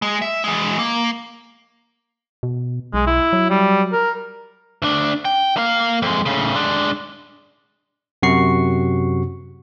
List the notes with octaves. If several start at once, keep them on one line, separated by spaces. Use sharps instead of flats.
G#3
E5
E3 G#3
A#3
B2
B1 G#3
E4
F#3
G3
A#4
D2 D4
G5
A#3 F5
F2 G#3
A2 C#3
G#3 D4
F#2 C3 F#4 C#6 C7